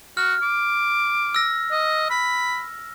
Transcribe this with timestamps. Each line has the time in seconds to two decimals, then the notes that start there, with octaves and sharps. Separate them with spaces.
0.17 F#4 F6
0.42 D6
1.35 E6 A#6
1.71 D#5
2.10 B5